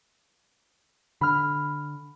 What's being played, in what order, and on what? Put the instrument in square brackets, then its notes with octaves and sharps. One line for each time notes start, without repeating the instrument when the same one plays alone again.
[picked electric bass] D3 [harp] B5 F6